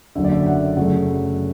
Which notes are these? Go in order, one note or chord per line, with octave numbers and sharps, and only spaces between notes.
F#1 F#2 D3 E5
D5
E5
F#5
F#2 C#3 F#3 A3 F#5